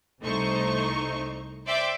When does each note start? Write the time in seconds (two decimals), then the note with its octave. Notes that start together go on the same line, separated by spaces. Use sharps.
0.21 C2 A3 D#4 C5 C#6
1.65 C5 D5 E5 G5 C6 D6